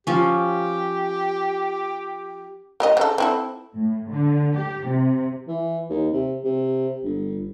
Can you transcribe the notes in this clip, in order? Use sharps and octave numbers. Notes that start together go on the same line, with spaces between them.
F3 C#4 G4
A#3 G4 D#5
C#3 A4
C4 E4 A4
A2
D3
G4
C3
E3
D#2
C3
C3
G1